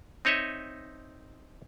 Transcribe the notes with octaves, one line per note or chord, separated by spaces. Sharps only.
C4 D#4 C#5 D#5 E5